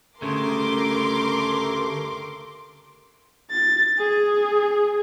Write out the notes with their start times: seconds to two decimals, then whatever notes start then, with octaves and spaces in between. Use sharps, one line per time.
0.22 D2 G2 C#3 A3 A#4 C6 D6
3.51 A6
3.99 G#4